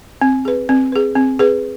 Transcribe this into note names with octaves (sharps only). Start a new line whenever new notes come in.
C4
G#4 B4
C4
G#4 B4
C4
G#4 B4